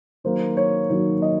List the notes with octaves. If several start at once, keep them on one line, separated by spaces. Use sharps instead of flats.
D#3 F#3 A#3 C5
C#5
D#3 F#3 A#3 C#5
D#5